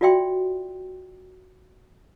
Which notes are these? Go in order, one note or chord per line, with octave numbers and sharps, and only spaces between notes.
F4 F#4 D5 E5 G5 C6